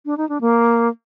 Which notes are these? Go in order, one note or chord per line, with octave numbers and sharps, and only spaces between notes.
D4
D#4
D4
A#3